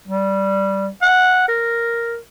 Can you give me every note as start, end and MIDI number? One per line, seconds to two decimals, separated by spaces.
0.08 0.88 55
1.02 1.45 78
1.48 2.17 70